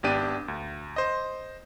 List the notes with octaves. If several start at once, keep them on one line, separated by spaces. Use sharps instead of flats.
G#1 B3 D4 G4 D5 D#7
D2
C5 D#5